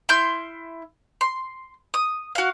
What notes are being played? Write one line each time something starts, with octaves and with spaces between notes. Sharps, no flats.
E4 C6 F6 G6
C6
D#6
F#4 F5